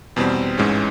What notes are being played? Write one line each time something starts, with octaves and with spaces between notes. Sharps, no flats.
E2 B2 G3 C4
A1 G#2 E3 G#3 C#4